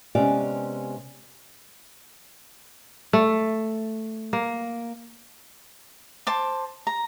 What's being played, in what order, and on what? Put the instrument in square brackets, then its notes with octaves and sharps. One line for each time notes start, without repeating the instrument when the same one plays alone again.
[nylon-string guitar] C3 G#3 B3 C#4 G4 D5
[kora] A3
A#3
[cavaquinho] C5 A5 D6
A#5